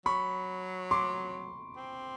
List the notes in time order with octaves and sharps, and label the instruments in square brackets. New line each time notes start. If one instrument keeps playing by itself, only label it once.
[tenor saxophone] F#3 [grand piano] B5 C#6
[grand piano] C6 D6
[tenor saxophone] C4